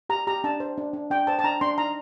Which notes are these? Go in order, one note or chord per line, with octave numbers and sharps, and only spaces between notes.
G4 A#5
G4 A#5
D4 A5
C5
D4
D4
D4 G5
C5 A5
A5
D4 A#5
D4 C6
D#4 A#5